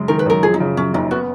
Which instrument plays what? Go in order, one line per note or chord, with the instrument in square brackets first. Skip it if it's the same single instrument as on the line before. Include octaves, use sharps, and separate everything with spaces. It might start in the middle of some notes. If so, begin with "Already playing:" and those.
Already playing: [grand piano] F#2 C#3 G#3
[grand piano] D#3 [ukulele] A#4
[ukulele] B4
[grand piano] F#2 [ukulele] A#4
[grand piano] F3 [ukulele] G#4
[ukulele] D#4
[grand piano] C#3
[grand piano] F#2 [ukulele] C#4
[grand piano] F#1 [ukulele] D#4
[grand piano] B3 [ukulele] F#4